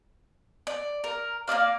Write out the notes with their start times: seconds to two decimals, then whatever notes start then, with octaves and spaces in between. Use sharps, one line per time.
0.67 D5
1.04 A#4
1.48 A#3 B3 D5 F5